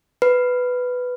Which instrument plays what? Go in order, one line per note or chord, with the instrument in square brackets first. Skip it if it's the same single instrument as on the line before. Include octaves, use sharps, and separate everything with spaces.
[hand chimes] B4